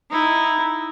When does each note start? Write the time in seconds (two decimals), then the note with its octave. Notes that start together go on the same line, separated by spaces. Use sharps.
0.10 D#4 E4